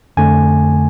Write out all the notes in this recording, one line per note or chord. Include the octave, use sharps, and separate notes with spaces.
F2 D3 A3 G#5